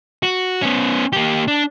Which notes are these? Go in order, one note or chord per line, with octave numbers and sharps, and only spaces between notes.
F#4
B3 C#4
A#3 G4
D4